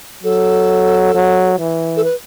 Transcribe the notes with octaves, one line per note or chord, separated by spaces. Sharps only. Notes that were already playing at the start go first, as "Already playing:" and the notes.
F#3 A4
F#3
E3
A4
B4